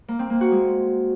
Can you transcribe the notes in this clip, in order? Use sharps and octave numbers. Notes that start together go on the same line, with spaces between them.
A#3
C4
A#3
F#4
G#3